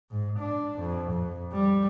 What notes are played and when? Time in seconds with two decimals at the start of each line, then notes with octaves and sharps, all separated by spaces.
0.11 G#2
0.39 D4
0.79 F2
1.12 F2
1.52 G3